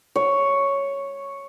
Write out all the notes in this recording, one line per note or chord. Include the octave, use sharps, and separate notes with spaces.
C#5